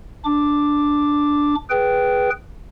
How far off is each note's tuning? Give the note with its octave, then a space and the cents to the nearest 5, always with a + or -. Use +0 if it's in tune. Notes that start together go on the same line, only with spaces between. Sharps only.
D4 -5 D6 +0
G#4 +0 B4 +0 G5 -15